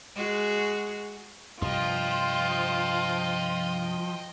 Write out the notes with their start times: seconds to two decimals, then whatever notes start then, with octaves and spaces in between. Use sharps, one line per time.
0.15 G#3 F#4 G#4
1.62 G2 C3 F3 G3 F4 D#5 G5